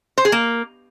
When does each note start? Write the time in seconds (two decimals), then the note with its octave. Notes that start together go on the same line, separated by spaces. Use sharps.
0.18 C5
0.25 G#4
0.32 A#3